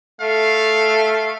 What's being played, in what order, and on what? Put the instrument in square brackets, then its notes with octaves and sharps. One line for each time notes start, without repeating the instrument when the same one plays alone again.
[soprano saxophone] A3 [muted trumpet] F5